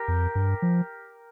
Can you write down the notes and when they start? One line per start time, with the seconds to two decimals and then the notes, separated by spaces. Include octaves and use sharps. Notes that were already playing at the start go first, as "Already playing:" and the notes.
Already playing: G4 A#4
0.08 F2
0.35 G2
0.62 F3